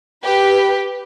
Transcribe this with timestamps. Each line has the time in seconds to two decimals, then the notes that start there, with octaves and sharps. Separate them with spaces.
0.24 G4 B4